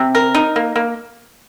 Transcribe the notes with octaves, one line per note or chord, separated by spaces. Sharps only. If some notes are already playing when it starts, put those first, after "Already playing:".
Already playing: C3
A#4
D#4
A#3
A#3